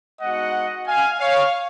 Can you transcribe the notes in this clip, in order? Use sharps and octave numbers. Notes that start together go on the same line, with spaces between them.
G#3 B3 D#4 F#4 D#5 F#5
F5 G#5
C#5 F5